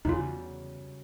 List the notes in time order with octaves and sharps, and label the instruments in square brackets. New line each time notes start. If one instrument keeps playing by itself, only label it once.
[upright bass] E2 [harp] C#3 G3 F#4 [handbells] D#4 F4